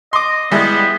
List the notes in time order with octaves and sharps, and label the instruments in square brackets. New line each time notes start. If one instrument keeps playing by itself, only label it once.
[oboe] D#5 [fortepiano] C6 D6
[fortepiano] G3 G#3 E4 [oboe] B3